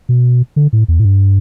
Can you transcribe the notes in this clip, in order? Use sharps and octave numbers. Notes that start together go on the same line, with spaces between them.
B2
D3
A2
E2
A2
G2